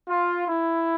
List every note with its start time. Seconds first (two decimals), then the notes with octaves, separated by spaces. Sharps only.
0.09 F4
0.48 E4